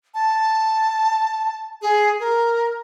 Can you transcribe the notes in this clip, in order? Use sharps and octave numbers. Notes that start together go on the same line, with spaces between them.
A5
G#4
A#4